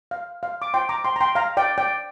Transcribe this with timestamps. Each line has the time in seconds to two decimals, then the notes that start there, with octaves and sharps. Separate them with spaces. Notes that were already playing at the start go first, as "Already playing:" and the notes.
0.11 F5
0.43 F5
0.62 D6
0.74 F4 C5 G5 C6
0.89 A#5 D6
1.04 G5 C6
1.16 A#5
1.21 G5 C6
1.35 F5 A#5
1.57 D5 G5
1.78 D5 G5